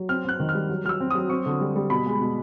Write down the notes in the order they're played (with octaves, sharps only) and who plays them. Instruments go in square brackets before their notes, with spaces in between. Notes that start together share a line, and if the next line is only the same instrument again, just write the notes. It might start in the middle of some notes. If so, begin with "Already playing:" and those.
Already playing: [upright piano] F#3
C4 F6
C4 F#6
D#3
F6
G3
F#3
F#3 F6
E6
C4
D#6
F#3
C4 C#6
D3
G3
G3
B2 B5
G#3
B2